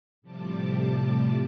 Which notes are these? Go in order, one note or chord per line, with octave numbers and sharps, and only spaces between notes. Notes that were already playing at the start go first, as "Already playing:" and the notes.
A2 C3 F3 G3 A5 D6